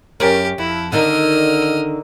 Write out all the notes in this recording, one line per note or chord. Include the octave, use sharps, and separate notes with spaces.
F#2 C#4 G4 A#4
F2 E4
D3 D#3 D#4 D#5 F6